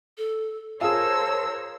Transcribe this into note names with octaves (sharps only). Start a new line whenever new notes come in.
A4
F4 G#4 A#4 C5 C#5 A5 E6